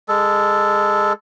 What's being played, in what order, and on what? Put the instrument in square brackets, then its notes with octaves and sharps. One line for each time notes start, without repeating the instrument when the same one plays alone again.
[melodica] G#3 A4